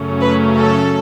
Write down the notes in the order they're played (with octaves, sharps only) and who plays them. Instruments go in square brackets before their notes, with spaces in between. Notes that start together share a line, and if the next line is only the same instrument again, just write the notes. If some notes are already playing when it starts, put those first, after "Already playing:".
Already playing: [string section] F#2 C#3 F#3 A3 C#4
B4
A4